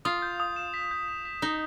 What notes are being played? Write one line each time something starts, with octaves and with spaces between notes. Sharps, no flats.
F4 D#6
G6
D#6
E7
B6
G6
B6
B6
D#4 B6